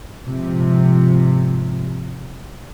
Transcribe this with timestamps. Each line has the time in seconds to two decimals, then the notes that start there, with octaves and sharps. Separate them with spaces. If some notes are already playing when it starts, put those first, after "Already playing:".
0.24 G#2 C3 F3